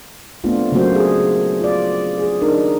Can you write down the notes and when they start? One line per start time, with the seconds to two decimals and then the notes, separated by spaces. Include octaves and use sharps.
0.44 A3 B3 C4 D4 F4
0.72 C#3 F#3 A3 A#3 F#4 C5
0.95 G#4
1.61 F4 D5
2.18 G#4
2.42 D4 D#4 A#4